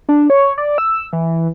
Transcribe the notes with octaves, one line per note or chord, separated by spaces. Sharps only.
D4
C#5
D5
E6
E3